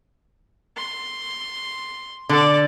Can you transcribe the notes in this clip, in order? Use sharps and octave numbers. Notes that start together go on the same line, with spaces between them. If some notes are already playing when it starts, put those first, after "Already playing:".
C6
D3 A4 D5